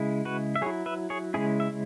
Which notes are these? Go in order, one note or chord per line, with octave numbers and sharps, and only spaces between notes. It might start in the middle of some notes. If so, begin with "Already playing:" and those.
Already playing: C#3 G#3 E4
F#4 B4
E5
F#3 E4 G#4 C#5
B4 E5
G#4 C#5
C#3 G#3 C#4 E4 G#4
E5